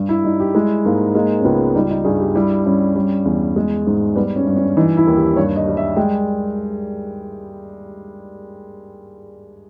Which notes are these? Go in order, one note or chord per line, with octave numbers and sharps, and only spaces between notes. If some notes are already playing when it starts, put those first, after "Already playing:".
Already playing: G2
E4
G3 D#4
G4
G#3 E4
G#2 A#3
G#3 A#3
C#4
C#2 B3
G3 D#4
D#4
G2 G#4
G4
G3 E4
G2 C#4
G3
E2
G#3
G#2
G3 B3
C#4
G2
C#4
E3 D#4
E4
D#2
G4
G2 C#5
D#5
G3
E5
G#3 G5